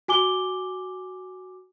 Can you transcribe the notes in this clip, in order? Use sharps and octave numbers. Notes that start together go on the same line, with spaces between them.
F#4 G#5 D6 G7